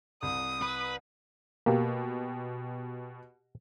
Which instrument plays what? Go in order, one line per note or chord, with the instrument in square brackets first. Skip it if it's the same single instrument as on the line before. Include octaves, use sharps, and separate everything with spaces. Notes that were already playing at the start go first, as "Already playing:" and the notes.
[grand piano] C2 [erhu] D#6
[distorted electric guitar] B4
[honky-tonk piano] B2 G4 [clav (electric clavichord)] A#3